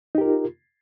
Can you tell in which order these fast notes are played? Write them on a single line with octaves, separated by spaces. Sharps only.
D#4 G4 A#4 F4